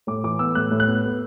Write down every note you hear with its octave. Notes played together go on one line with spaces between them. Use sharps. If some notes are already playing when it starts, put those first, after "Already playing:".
A2 D6
E3 D6
B3 E6
A2 F#6
A2
F#6
B3
B3